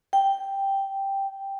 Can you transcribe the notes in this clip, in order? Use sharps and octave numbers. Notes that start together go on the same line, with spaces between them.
G5